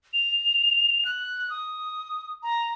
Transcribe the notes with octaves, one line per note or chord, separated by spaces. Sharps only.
F7
F#6
D#6
A#5